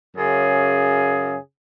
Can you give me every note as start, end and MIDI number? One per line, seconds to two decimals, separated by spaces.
0.17 1.35 42
0.17 1.35 49
0.17 1.35 68